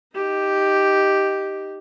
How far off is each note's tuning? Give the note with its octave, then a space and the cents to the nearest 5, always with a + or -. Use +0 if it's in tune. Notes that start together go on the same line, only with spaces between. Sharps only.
D#4 +0 G4 +0